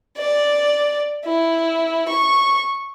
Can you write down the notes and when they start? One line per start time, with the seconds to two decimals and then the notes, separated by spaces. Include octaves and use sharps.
0.17 D5
1.25 E4
2.08 C#6